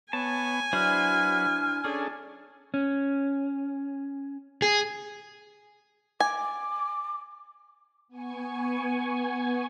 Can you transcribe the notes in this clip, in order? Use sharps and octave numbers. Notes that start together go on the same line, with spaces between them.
B3 C#5 G#5 A5
F#3 D4 E4 B4 C5 F6
C#4 D4 G#4 A4
C#4
G#4
G#5 D6
B3 G#5 C#6